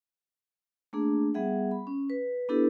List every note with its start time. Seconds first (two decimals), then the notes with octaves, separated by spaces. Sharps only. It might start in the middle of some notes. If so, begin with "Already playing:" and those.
0.93 A3 A#3 D4 G#4
1.34 G3 B3 G#4 E5 F#5
1.71 B5
1.87 C#4
2.10 B4
2.49 B3 D4 E4 G4 A4 B4